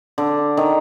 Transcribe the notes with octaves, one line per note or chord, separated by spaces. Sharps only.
D3
D#3